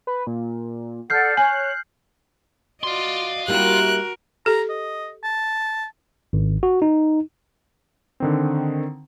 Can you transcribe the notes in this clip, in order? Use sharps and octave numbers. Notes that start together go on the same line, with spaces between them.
B4
A#2
A4 D5 F#5 F6 G6 C7
C#5 G#5 F#6
F#4 D5 D#5 F5 C6
G3 A#3 E4 F#4 A#4 F#6
G4 A4 A#5
D#5
A5
G#1
F#4
D#4
D3 D#3 C4